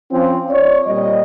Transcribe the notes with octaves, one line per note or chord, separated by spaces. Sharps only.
F3 C4 C#4 F4
C#5 D5
A#2 G3 D#5